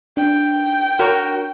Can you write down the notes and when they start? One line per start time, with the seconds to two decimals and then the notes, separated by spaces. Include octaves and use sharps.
0.17 D4 G5
0.99 F#4 A#4 C#5